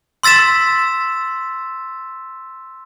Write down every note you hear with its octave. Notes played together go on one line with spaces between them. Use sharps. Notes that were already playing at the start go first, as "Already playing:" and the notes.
C6 E6 A6 B6 E7